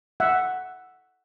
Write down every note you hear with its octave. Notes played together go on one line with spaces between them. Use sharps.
E5 F#5